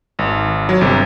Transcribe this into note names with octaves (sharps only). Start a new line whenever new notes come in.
G#1
F#3
G1 C3